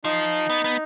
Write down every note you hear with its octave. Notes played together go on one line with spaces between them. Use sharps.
F3 D#4
B3
B3